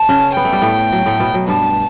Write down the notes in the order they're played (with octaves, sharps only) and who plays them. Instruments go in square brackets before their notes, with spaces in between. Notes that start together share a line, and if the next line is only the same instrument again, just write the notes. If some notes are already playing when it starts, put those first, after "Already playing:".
Already playing: [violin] A5
[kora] C#3 C#4
[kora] B3 [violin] G5
[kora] A3
G3
A2 A3
F#3
A2 A3
B2 B3
F#3
[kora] G2 G3 [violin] A5